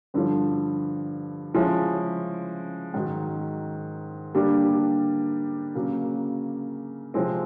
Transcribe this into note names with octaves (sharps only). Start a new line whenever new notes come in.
G2 D3 F3
C#3 F3 G#3 C#4 E4
G#2 D#3 F#3
D3 G3 A#3 D4 G4
C#3 F#3 A#3
C3 F3 G#3 C4